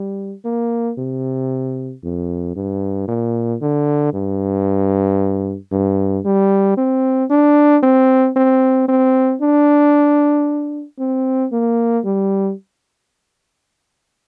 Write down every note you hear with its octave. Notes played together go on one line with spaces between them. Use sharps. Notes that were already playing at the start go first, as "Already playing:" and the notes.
Already playing: G3
A#3
C3
F2
G2
A#2
D3
G2
G2
G3
C4
D4
C4
C4
C4
D4
C4
A#3
G3